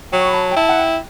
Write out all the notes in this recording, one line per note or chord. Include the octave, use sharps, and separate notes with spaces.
F#3 G5
C#6
B5
A5
G5
E4 A5
F#5
G5